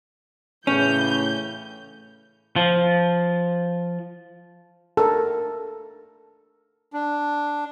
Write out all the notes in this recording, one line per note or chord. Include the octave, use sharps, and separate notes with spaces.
A2 C#3 E3 C#4 G6
F3
A4 A#4
D4